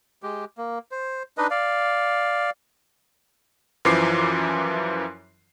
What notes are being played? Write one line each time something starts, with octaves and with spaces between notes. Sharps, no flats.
G#3 G4
A#3
C5
D4 D#4 B4 D#5
D5 F5
F#2 E3 F3 D6 C7